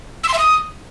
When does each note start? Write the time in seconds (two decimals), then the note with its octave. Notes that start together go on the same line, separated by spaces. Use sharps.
0.23 E6
0.29 C6
0.34 E5
0.39 D#6